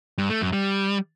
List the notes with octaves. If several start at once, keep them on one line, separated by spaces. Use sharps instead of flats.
G2
A3
F#2
G3